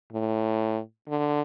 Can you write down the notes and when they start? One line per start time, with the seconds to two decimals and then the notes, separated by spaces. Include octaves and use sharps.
0.12 A2
1.08 D3